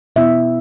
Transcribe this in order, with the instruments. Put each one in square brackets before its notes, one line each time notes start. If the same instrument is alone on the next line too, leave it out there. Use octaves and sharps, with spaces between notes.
[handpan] B2 B3 E4 E5